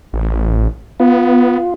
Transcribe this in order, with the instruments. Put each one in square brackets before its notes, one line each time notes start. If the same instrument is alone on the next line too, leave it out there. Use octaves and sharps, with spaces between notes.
[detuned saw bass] A1
[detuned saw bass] B3 [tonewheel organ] F4